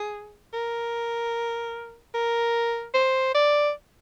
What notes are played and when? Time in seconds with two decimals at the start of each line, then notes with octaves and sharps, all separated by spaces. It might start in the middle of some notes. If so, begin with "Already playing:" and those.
Already playing: G#4
0.53 A#4
2.14 A#4
2.94 C5
3.35 D5